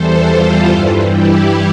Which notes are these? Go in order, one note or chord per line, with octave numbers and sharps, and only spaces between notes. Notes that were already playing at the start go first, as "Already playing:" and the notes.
Already playing: E2 E3 G3 A4 C5
F4 A4
G2 E3 G3
E4 G4